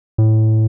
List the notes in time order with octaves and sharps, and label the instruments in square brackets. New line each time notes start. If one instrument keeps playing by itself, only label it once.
[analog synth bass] A2